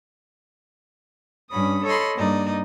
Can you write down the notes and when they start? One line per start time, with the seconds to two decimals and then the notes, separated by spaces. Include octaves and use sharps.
1.50 G2 C#4 B5 D#6
1.85 A4 C#5 D#5 B5 C6
2.16 G2 A#3 D#4 D5 D#6